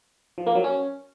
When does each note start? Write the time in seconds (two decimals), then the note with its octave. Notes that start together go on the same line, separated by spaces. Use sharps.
0.38 F3
0.47 A#3
0.55 F#3
0.64 C#4